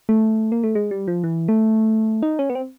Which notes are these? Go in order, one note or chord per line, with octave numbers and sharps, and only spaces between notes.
A3
A#3
A3
G#3
G3
F3
E3
A3
D#4
C#4
B3
C4